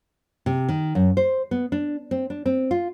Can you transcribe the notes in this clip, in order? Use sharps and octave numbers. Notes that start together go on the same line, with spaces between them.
C3
D#3
F#2
C5
B3
D4
C4
D4
C4
F4